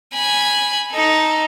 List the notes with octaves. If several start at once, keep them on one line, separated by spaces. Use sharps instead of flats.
G#5 B5
D#4 A4